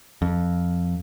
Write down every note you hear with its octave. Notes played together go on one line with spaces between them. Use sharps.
F2